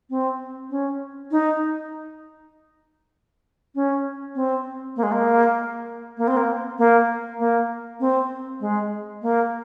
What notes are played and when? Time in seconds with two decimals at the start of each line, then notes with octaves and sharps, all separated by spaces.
0.10 C4
0.70 C#4
1.31 D#4
3.75 C#4
4.35 C4
4.96 A#3
5.03 G#3
5.12 A#3
6.18 A#3
6.28 C4
6.37 A#3
6.78 A#3
7.39 A#3
8.00 C4
8.60 G#3
9.22 A#3